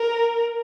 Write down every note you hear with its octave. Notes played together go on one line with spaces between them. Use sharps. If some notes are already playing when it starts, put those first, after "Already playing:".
Already playing: A#4